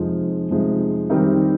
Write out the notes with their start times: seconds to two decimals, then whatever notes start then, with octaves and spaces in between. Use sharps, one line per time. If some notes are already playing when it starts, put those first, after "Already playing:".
Already playing: F2 C3 F3 G#3 D#4
0.51 F2 C3 F3 G#3 D#4
1.10 D#3 G3 C4 D#4 A#4